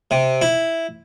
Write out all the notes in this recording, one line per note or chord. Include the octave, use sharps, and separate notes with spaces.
C3
E4